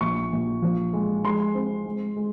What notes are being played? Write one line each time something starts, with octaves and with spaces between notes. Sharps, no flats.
A#1 C#6
A#1
F3
G#3
G#3 C6
C4
G#3
G#3